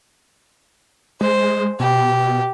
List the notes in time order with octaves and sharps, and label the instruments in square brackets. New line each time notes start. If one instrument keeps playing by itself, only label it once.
[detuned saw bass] G#3 [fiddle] C5
[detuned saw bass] B2 [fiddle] G4